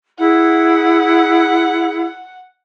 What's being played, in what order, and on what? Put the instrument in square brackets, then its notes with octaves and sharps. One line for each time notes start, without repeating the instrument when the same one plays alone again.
[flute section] E4 G#4 [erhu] F#5